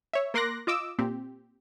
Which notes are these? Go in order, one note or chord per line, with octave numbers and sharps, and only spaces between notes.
C#5 E5
A#3 A#4 C6 D6 F#6 A#6
F4 D#5 D6 E6
A#2 C4 G4